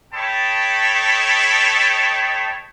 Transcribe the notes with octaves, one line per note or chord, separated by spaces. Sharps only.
A4 C#5 D#5 G5 A5 B5